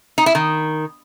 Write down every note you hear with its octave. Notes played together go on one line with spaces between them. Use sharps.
D#4
E4
D#3